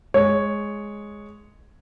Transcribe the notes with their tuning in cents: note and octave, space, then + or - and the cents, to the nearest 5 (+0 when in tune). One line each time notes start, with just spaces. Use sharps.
G#3 +0 C#5 +0